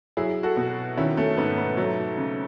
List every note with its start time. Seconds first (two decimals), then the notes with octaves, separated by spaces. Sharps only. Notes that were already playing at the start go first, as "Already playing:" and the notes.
0.17 F#3 E4 G#4
0.43 F#4 A4
0.57 B2
0.97 D#3 C#4 E4
1.17 A3 C#4
1.37 G#2 B3
1.57 B3
1.77 F#3 A3
2.17 C#3